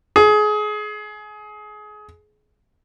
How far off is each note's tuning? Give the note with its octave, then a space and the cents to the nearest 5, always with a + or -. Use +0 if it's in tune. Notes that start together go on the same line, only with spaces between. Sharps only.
G#4 +25